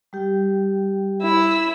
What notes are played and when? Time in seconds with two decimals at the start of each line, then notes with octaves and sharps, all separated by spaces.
0.13 G3 G4 G5
1.22 E4 E6